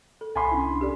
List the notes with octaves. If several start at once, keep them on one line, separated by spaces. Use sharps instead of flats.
A4
C2 G#5 B5 C6
C#4 D4 E4
G4 A4 D5